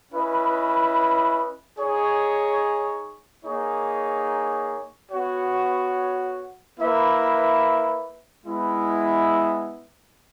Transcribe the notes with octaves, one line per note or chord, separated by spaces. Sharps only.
C#4 E4 B4 D#5
D#4 G#4 C#5
A#3 D#4 G#4 C#5
B3 F#4 C#5 F#5
A#3 E4 B4 E5
G#3 B3 E4